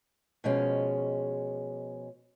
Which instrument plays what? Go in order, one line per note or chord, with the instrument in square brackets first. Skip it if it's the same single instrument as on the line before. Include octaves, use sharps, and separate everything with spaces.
[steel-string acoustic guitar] B2 F3 G#3 C#4